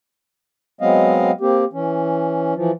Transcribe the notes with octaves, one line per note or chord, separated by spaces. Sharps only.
F#3 G#3 B3 C4 D#5 F5
A#3 C4 G4
E3 C#4
E3 F3